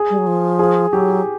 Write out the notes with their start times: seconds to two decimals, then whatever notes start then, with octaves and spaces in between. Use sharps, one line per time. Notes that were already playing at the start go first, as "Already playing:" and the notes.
Already playing: G#4
0.10 G3
0.18 F#3
0.27 F3
0.59 G#4
0.92 F#3 G4